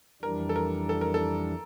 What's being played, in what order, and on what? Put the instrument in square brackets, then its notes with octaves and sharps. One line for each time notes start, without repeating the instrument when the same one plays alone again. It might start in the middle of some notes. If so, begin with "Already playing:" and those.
[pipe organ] F2 E3 G3 D4 [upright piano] A#4
[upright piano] A4
A#4
A4
A#4
A4